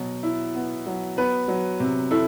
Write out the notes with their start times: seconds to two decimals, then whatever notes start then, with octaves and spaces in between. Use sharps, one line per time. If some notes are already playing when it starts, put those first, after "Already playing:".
Already playing: B2 F#3
0.23 E4
0.55 B3
0.86 F#3
1.17 B3 B4
1.48 F#3
1.80 C3
2.11 E4 A4